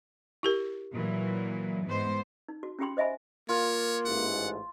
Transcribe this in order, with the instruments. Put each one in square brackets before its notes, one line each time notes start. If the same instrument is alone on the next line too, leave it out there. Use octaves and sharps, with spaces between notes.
[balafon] E4 G4 A#4
[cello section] A#2 E3 F#3
G#2 B3 C5
[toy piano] D#4
F#4
C#4 F4 G4 G5 B5 C6
C5 D#5 E5 G#5 B5
[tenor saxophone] A#3 [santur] F4 [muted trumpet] C#5
[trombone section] A1 G#2 [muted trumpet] F#5